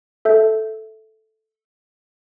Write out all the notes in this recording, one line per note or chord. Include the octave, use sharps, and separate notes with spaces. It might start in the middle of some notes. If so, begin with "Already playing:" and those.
A4 E5 G6